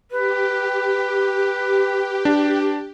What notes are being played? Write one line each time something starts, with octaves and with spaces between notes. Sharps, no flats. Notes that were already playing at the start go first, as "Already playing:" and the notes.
G4 B4
D4